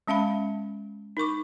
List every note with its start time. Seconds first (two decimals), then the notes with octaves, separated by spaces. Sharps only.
0.08 G#3 C#4 E5 F5 B5
1.17 D#4 A#4 C#6 D6